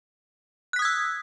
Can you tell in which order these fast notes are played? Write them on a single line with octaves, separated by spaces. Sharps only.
F#6 B6 D#6 G#6 E6